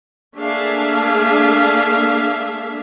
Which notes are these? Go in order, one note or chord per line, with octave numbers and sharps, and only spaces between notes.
A3 A#3 D4 G#4 E5 F5